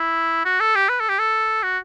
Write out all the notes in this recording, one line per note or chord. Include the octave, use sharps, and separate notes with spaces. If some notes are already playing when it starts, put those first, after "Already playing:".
Already playing: E4
F#4
A4
G4
B4
A4
G4
A4
F#4